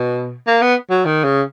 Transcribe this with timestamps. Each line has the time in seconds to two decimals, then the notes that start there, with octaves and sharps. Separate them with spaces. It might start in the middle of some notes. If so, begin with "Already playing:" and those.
Already playing: B2
0.47 A#3
0.62 B3
0.91 F#3
1.05 D#3
1.24 C#3